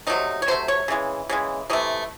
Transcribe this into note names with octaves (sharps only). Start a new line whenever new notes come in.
C3 F#3 A3 D#4
C#5
C3 F#3 A3 C5
C#5
C#3 E3 G#3
C#3 E3 G#3
C3 E3 A3 D#5